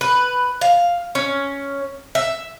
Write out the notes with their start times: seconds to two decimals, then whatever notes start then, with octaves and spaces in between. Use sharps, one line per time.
0.01 B4
0.61 F5
1.15 C#4
2.15 E5